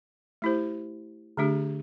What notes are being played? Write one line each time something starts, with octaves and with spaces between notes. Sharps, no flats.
A3 E4 G4 C5
D3 A3 D4 G4